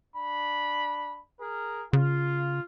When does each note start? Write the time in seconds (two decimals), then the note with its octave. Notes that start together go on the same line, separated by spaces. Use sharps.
0.15 D4 B5
1.40 G#4 A#4
1.93 C#3 F4